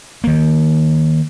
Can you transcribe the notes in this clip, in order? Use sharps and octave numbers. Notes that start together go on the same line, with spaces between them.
D#3 A#3